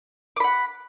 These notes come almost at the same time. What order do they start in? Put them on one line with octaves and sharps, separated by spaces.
D6 B5 F#5